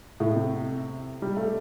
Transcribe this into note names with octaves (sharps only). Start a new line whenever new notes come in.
A2
C3
G3
A3